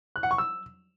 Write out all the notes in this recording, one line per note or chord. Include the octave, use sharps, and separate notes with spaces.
F#6
F#5
C#6
E6